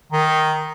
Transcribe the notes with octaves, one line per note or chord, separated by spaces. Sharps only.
D#3